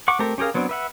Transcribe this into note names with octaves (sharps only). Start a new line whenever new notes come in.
F#5 C#6 D6
A3 C4 G4 A#4
C#4 G4 G#4 A#4 F5
F#3 B3 C4 D4
B4 E5 F#5